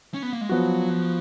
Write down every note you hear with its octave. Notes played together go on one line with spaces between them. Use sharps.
C#4
B3
A#3
G#3
F3 F#3 B3 F#4
F3